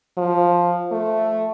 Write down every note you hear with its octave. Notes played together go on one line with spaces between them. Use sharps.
F3
A3